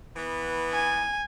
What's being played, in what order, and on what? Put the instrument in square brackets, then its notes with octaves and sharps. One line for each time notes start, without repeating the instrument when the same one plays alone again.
[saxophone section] E3 B3
[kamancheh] G#5